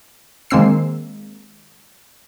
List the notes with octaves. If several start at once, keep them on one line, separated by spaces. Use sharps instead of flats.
D#3 G#3 A#3 C4 E6 C7